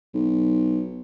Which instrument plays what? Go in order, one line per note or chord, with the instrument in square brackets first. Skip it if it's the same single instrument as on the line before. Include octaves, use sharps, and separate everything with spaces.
[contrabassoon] B1